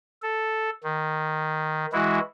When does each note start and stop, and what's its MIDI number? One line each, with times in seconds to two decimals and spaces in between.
0.23 0.70 69
0.84 1.86 51
1.93 2.19 52
1.93 2.19 56
1.93 2.19 64
1.93 2.19 66